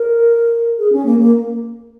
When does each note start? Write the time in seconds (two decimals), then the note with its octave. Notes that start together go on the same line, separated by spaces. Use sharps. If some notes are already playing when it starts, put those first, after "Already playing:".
Already playing: A#4
0.79 G#4
0.92 C#4
1.05 A#3
1.19 A#3